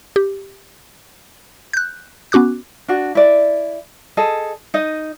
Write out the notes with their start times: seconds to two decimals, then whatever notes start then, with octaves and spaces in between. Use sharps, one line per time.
0.16 G4
1.73 F#6 G6
2.32 B3 C#4 F#4 D6 F#6
2.88 D4 F#4
3.15 E4 D5
4.17 G#4 A4 D#5
4.74 D#4 D#5